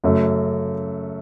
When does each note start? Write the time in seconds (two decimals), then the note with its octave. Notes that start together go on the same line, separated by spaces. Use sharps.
0.04 F#2 C#3 A3